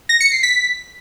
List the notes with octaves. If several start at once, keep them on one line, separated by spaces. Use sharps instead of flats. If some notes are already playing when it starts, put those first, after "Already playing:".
A#6
C#7
C7
B6